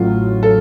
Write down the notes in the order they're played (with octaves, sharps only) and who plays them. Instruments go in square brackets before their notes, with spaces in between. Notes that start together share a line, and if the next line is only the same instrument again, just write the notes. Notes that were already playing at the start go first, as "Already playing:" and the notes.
Already playing: [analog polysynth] A1 A2 F#3 [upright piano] F4
[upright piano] A4